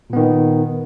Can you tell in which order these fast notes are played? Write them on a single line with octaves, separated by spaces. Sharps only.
A#2 B3 D#3